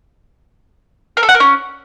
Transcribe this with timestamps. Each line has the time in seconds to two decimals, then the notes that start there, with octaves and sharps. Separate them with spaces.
1.17 A#4
1.23 A4
1.29 F#5
1.34 A#4
1.40 C#4